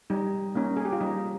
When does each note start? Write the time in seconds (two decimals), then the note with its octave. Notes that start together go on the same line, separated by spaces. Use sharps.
0.10 G3 D#4
0.55 A#3 C#4 D#4
0.77 G#4
0.85 G4
0.92 F4
1.00 G3 D#4